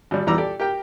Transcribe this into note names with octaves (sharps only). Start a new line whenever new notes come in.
G#1 G3
E2 E3 G3 A#5 D6 E6
G4 A4 D5
G4 A#4 G5